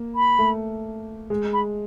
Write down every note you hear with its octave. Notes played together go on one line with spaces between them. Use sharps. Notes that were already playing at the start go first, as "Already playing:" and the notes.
Already playing: A#3
B5
A3
G#3
B5